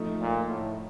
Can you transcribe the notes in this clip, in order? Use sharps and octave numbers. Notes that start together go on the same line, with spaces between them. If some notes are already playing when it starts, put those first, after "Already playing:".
Already playing: F3 A3 D#4
A#2
A2